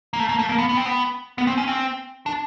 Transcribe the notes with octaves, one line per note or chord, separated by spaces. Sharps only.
A#3
A3
A#3
A3
A#3
B3
B3
C4
B3
B3
C4
C#4
C4
D4